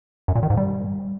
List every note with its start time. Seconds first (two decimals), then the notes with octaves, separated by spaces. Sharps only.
0.28 F#2
0.35 A#2
0.43 D#3
0.50 G#2
0.57 G3